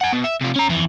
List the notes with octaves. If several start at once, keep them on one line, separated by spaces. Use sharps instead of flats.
F#5 G#5
B2
E5
C3 F4
C#4 A#5
F2 E3